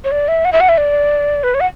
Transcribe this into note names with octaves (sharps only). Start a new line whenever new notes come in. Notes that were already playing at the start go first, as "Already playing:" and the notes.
C#5
D5
E5
F#5
E5
F#5
E5
D5
B4
C#5
F#5